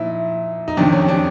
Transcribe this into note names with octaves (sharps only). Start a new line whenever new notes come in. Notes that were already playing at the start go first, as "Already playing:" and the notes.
Already playing: A#2 F3 D#4 E4
D#4
F2 C3 D#3 D4
C#4
D4